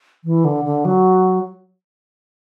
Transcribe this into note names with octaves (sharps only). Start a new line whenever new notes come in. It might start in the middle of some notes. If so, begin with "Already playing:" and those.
E3
D3
D3
F#3